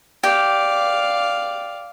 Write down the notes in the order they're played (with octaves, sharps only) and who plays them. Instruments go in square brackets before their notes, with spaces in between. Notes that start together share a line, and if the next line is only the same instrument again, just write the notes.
[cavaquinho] G4 [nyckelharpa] D5 F5